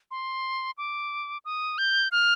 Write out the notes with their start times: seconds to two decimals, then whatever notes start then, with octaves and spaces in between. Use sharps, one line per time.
0.11 C6
0.78 D6
1.45 D#6
1.78 G6
2.12 F6